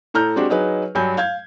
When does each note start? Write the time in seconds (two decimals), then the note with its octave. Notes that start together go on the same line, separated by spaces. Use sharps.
0.14 A2 A4 A#5 F6 G6
0.36 G#3 C4 D4 F#4 G4
0.50 F#3 D#4 G#4 B4
0.95 G2 F#3 G#5 G6
1.17 F5 G6 G#6